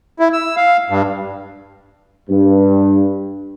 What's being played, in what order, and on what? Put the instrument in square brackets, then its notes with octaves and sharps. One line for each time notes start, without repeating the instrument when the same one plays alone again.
[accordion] E4
E6
F5
G2
[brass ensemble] G2